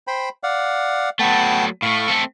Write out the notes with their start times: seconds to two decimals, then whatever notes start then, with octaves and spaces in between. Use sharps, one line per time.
0.07 C5 G5 B5
0.43 D5 F5 F#5
1.19 F#3 A3 B3 G5 A5
1.82 A2 A3 F5 C#6
2.08 A3 C4 A4